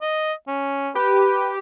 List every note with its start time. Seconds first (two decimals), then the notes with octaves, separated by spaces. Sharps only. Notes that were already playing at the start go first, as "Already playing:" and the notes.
0.02 D#5
0.48 C#4
0.95 G4 B4